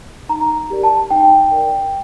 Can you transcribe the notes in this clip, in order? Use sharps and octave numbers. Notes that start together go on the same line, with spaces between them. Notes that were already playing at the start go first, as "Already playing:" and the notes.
D#4 A#5
G4 A#4 D5
A5
D#4 G5
A#4 D5